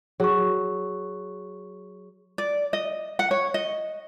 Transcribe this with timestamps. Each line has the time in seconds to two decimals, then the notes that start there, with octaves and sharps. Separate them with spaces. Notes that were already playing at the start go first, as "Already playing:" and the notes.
0.20 F#3 G#4 C#6
2.38 D5
2.73 D#5
3.19 F#5
3.31 C#5
3.54 D#5